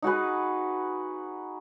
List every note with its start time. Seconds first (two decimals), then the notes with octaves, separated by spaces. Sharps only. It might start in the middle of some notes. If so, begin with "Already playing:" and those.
0.02 D#4 F#4 G#4 B4